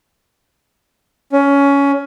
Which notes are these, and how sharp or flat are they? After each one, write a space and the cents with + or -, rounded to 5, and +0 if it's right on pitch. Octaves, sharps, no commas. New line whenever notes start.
C#4 +15